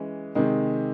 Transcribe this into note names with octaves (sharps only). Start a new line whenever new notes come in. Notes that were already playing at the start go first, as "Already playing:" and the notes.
Already playing: E3 G#3 C#4
C3 D#3 G#3